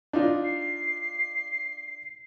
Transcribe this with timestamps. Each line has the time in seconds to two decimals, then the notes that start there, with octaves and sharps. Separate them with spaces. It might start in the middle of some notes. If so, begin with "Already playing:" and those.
0.13 D4 D#4 F4
0.44 C7